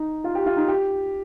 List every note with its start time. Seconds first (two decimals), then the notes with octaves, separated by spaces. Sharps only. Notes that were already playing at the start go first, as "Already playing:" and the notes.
Already playing: D#4
0.24 F4
0.35 G4
0.46 F4
0.57 D#4
0.68 G4